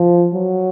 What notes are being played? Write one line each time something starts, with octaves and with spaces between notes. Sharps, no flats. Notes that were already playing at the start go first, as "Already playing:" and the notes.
Already playing: F3
F#3